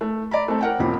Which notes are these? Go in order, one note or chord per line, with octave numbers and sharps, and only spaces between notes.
A3
D5 A#5 B5
A3 C4 A4
A#4 F#5 G5
D#1 A#2 C4 B5